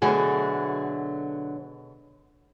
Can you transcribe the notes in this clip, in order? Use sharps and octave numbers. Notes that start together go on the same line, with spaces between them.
B2 D3 F#3 A3 F#4 G#4